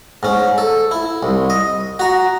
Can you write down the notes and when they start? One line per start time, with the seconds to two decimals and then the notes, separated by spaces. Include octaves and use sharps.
0.23 G#2 C#4
0.58 A4
0.91 E4
1.23 C2
1.50 D#5
1.99 F#4 A#5